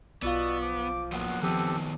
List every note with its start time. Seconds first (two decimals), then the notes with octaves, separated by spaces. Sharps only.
0.22 B1 B2 B3 F4 D5 F5 C#6 E6
0.62 F3 D6
1.12 F3 F#3 A#3 B3 F#5
1.43 D#3 F3 B3 C4 G4 A4